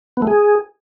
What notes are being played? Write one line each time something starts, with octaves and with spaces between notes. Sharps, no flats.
B3
A3
G#4